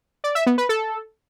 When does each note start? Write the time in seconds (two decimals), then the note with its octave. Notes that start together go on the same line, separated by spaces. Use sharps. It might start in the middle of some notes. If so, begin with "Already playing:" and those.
0.24 D5
0.35 E5
0.46 B3
0.58 B4
0.69 A4